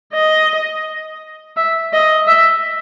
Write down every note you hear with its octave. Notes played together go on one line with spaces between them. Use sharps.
D#5
E5
D#5
E5